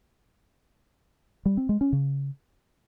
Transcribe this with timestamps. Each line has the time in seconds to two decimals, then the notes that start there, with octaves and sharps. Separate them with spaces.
1.46 G3
1.57 C4
1.69 G#3
1.81 C#4
1.93 C#3